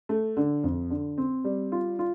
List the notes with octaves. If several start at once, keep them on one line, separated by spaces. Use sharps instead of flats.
A3
D3
F2
D3
C4
G3
F4
F4